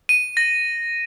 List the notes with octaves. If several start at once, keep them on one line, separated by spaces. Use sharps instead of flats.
D#7
A#6